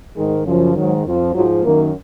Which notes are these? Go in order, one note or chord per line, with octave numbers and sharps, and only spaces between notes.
G#2 D#3 G#3
F#2 C#3 F3
G#2 D#3 F#3
F2 F3
G#2 F3 F#3
F#2 D#3 A#3